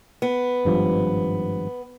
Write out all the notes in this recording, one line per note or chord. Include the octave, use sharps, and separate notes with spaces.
B3
G#1 G2 F3